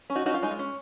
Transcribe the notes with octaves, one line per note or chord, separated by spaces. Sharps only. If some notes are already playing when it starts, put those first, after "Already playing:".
C#4
D#4 F#4
C#4 D#4 F#4
F4
G#3 D#4
F4
C#4